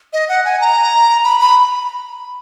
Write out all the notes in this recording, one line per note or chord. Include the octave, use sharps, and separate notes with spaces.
D#5
F#5
G#5
A#5
B5
B5